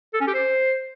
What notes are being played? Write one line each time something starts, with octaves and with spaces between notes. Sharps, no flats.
A4
C#4
G4
C5